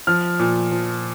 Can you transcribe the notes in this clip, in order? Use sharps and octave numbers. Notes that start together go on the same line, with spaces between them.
F3 F6
A#2
F3